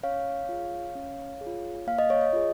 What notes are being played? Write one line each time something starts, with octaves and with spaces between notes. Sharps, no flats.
C#4 C#5 F5
F4 G#4
C#4
G#4
F4
A#3 F5
D#5
C#5
D#5
F4 G#4